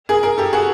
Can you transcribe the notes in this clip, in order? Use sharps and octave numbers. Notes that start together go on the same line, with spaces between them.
G#4 A#4
G#4 A#4
G4 A4
F#4 G#4